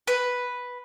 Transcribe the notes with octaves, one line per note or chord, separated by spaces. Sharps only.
B4